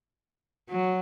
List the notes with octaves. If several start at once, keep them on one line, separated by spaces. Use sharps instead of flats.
F#3